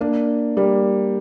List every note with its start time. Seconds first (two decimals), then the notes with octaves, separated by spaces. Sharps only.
0.01 A#3 D4
0.57 G3 A#3